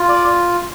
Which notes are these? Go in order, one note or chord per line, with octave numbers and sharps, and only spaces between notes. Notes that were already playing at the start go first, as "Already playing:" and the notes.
Already playing: F4
D5